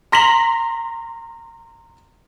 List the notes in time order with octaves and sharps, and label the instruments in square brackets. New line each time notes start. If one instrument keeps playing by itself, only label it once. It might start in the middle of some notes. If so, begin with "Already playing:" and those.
[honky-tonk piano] A#5 C6 A#6 B6 F7 F#7